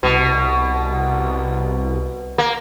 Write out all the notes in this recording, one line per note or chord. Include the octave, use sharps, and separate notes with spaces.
C2 B2
A#3